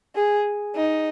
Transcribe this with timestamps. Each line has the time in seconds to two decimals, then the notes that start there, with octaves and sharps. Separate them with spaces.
0.15 G#4
0.76 D#4